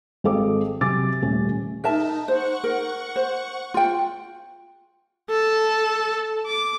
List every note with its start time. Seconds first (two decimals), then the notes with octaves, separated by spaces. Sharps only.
0.24 G#1 C4 G#4 A4 D#5 D6
0.81 C3 F#3 G#5 D6 A6
1.22 D#1 A3 C#4 G#5
1.84 D#4 A#4 E5 A5
2.28 C5 F#5 C#6
2.64 A#4
3.16 C5
3.74 F4 G5
5.30 A4
6.47 D6